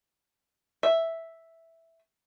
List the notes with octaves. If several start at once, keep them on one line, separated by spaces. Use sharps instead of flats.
E5